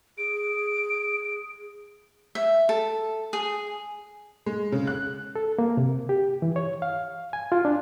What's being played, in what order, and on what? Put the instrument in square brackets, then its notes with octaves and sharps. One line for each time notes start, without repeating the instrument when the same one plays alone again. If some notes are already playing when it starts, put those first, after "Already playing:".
[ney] G#4 [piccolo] D7
[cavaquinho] E5
A4
G#4
[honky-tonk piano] G#3
C#3
F#6
[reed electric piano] A4
A#3
C3
G4
E3
C#5
F5
G#5
F4
D4